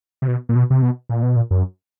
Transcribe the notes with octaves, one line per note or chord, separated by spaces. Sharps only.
C3
B2
A#2
B2
C3
B2
A#2
B2
A#2
F#2